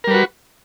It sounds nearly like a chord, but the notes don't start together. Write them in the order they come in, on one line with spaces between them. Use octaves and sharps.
A#4 G3 B4 F#4